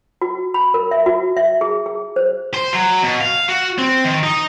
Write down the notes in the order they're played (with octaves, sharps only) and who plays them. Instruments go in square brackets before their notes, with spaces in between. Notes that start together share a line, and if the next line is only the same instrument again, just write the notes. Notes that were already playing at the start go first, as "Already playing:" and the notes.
[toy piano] F#4
B5
A#4
E5
F#4
E5
G#4
G#4
C5
[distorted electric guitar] C5
F#3
B2
F5
F#4
C4
D#3
D#4